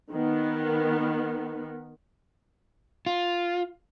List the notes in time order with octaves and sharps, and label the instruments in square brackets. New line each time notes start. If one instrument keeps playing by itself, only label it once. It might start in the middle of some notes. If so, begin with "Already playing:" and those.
[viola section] D#3 B3
[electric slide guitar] F4